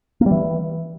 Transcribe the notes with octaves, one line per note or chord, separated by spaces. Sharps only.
A#3
G3
E3